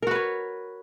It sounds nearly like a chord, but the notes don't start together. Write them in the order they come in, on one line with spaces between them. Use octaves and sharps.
A#4 F#4 B4 C#5